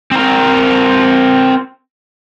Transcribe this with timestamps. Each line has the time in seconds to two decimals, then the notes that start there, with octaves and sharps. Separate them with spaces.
0.12 C4 A#4